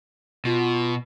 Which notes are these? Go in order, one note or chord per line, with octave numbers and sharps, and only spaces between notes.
B2 F4